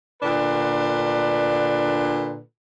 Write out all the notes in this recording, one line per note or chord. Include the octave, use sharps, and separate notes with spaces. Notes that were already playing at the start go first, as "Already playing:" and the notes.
A#2 D3 D4 B4